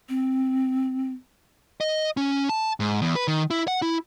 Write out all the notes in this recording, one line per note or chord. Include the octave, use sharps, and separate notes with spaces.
C4
D#5
C#4
A5
G#2
E2
B4
D#3
E4
F#5
E4